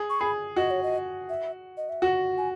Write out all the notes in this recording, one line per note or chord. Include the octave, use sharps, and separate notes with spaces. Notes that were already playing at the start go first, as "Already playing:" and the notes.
Already playing: G#4
C#6
G#4 B5
F#4 D#5
C#5
D#5
E5
D#5
E5
F#4 F#5
G#5